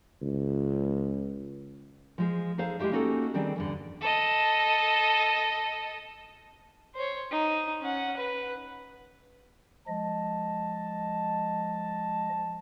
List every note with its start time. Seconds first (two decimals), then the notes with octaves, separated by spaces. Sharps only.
0.22 C#2
2.18 F3 G#3 C5
2.58 D#4 G#4 A4 C5 F5
2.79 G#3 E4 G4 C5 E5
2.92 A#3 C#4 D#4 F#4 G4 A4
3.34 D#3 G3 C4 D4 G#4
3.56 E2 G2 D3
4.01 A4 D#5
6.95 C5 C#5
7.31 D#4
7.81 C#4 F#5
8.17 B4
9.88 F3 G#3 D#5 A5